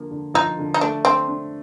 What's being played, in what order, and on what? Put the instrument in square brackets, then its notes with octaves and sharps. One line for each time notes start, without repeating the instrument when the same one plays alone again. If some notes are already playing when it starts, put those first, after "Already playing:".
Already playing: [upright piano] D3 F3 A#3
D3
[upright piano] F3 [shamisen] D#4
[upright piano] D3
[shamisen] D#4
[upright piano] A3 [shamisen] D4
[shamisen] C4 [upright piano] D4
[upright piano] D4